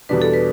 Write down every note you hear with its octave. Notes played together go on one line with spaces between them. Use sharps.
E2 B2 G3 D4 B4
A4
B4